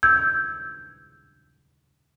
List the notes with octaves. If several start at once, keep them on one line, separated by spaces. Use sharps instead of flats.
E6 G6 G#6